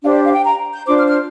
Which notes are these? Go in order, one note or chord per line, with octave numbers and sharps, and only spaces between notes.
D4 G4 C5 F5
D5
F5
G5
A#5
G6
D4 F4 C5 D6
F6
F6